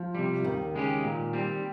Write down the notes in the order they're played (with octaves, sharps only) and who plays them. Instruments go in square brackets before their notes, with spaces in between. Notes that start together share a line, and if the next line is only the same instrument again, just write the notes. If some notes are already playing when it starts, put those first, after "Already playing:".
Already playing: [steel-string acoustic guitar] F3
[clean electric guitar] C3 G3
[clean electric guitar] D#2 [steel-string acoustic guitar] D#3
[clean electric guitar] C#3 G#3 C#4 G4
A#2
G3 C4